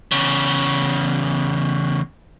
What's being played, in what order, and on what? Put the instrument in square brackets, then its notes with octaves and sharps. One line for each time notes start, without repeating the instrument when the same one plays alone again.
[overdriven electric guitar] E2 C#3